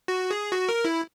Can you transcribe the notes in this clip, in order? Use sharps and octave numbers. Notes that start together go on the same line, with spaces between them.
F#4
G#4
F#4
A#4
E4